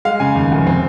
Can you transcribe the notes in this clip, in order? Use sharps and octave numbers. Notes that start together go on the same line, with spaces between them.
G#3 F5
C#3 G#5
D#2
F1
C4